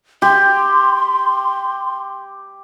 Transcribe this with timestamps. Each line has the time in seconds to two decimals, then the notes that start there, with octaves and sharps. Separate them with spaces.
0.22 G4 C6